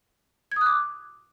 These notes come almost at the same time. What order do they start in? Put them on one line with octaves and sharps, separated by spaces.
G#6 D#6 F#6 D6